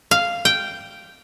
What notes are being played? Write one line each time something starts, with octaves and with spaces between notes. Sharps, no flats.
F5
G5